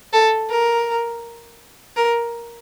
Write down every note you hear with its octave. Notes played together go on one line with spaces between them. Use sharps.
A4
A#4
A#4